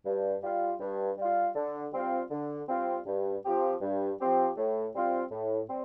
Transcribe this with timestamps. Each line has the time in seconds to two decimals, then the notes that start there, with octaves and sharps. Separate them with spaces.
0.06 G2
0.43 G3 F4
0.80 G2
1.18 G3 F4
1.55 D3
1.93 G3 C4 F4
2.30 D3
2.68 G3 C4 F4
3.06 G2
3.44 F3 C4 G4
3.81 G2
4.19 F3 C4 G4
4.57 A2
4.94 G3 C4 F4
5.31 A2
5.69 G3 C4